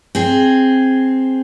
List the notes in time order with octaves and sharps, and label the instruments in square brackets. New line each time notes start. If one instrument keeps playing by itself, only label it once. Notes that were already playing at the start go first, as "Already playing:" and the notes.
[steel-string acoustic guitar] C4 G#4